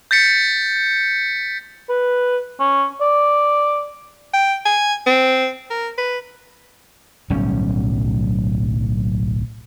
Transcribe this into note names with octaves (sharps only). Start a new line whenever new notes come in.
G6 A6 B6 C#7
B4
C#4
D5
G5
G#5
C4
A#4
B4
D1 B1 G3 C#4